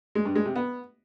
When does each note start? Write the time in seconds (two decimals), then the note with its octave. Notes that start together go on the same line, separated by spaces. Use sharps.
0.15 G#3
0.25 G2
0.35 G#3
0.45 C3
0.56 B3